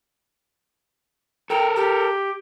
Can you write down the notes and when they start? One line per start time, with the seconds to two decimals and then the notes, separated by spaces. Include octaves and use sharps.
1.50 A4 A#4 G5
1.76 G4